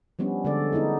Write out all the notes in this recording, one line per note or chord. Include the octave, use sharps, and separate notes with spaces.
F3 G3 B3 C#4 D4
D3 G#3 D4 A4 D5
A3 B3 D#4 E4 G#4